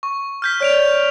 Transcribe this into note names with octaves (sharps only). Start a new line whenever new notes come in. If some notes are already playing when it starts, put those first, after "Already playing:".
C#6
F6 G6 B6
C#5 D5 F6 D7 F7